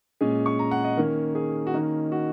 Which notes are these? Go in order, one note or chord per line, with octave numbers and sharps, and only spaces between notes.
A#2 G#3 C#4 G#4
C#6
A#5
F#5
D#5
D#3 A#3 C#4 A#4
G#4
F#4
D#3 A#3 C#4 D#4
F#4